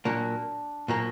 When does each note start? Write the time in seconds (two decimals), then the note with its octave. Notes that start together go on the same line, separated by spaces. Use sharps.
0.05 A#2 F#3 A#3 D4
0.88 A#2 F#3 A#3